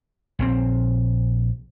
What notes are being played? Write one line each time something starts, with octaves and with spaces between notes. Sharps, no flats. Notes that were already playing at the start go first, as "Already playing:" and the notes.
A#1 E3 C4